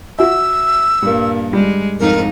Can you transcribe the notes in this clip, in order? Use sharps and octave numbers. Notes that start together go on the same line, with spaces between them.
F#4 E5 E6
G2 A#2 G3 A#3
G3 G#3
F2 G#2 D#4 A#4